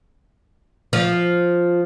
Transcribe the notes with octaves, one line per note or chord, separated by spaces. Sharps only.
F3